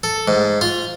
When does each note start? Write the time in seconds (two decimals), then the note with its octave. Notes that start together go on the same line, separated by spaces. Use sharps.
0.03 A4
0.28 G#2
0.61 F4